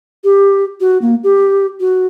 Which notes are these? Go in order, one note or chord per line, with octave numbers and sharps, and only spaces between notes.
G4
F#4
A#3
G4
F#4